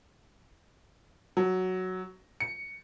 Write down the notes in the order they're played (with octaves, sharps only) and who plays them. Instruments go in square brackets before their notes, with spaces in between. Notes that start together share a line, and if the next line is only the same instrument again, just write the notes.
[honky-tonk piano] F#3
C#7